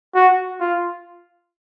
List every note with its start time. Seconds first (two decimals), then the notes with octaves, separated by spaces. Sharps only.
0.15 F#4
0.61 F4